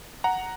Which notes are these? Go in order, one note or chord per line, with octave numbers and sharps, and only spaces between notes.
F#5 A#5